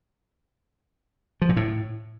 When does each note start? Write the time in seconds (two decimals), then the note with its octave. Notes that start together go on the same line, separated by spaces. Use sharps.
1.42 F3
1.49 A#2
1.57 A2